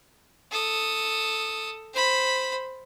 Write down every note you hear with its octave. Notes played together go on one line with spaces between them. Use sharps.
A4 D#6
C5 B5